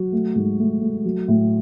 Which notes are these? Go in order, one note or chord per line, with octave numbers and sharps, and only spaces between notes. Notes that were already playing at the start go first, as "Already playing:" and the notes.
Already playing: F#3 F#4
A3
G#2
A3
A3
F#3
A2